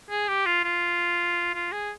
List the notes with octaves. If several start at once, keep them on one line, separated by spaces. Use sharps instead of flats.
G#4
G4
F4
F4
F4
G#4